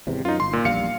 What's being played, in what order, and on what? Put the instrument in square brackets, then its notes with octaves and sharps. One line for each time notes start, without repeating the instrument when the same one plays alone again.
[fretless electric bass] G#1 E2 C3
[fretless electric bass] F#2 [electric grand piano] D#4 F4
[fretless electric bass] G1 [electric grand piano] C6
[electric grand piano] A#2
[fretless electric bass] A#1 E2 G3 [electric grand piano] F5 C#7